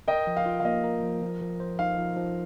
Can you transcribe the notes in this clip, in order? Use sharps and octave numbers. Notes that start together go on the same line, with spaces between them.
A#4 D#5 G5
F3
F5
F4
F5
A#3 D#5
A#4
F3
F3
F3
C5
D#4 F5
F3
F3